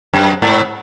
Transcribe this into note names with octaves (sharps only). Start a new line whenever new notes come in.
F#2
G#2